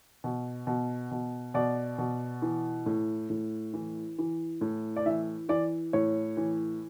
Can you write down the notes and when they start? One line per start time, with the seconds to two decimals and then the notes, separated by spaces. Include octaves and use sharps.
0.24 B2
0.67 B2
1.11 B2
1.54 B2 D5
1.98 B2
2.42 E3
2.86 A2
3.30 A2
3.73 E3
4.19 E3
4.61 A2
4.96 D5
5.06 E3 E5
5.49 E3 D5
5.93 A2 C#5
6.37 E3